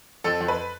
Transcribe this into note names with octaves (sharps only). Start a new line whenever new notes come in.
F2 A4
F2
B4